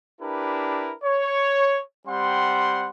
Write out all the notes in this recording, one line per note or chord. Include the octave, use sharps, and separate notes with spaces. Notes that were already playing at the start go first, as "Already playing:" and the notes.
D4 E4 G4 A#4 B4
C#5
G3 C4 F#5 C6